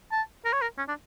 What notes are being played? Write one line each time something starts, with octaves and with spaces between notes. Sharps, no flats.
A5
A#4
C#5
A#4
C#4
D4